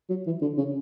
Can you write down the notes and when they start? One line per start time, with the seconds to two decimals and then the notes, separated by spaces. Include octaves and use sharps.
0.09 F#3
0.26 E3
0.41 D3
0.58 C#3